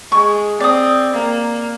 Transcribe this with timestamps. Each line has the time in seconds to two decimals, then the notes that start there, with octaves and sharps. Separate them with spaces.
0.12 G#3 C#6
0.60 C4 D5 D#6
1.13 A#3